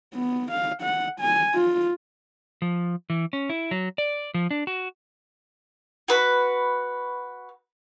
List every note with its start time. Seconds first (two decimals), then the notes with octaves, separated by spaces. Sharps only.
0.14 B3
0.51 F5
0.82 F#5
1.20 G#5
1.54 F4
2.62 F3
3.10 E3
3.33 C#4
3.50 E4
3.71 F#3
3.98 D5
4.34 F3
4.51 D4
4.67 F#4
6.08 F#4 B4 B5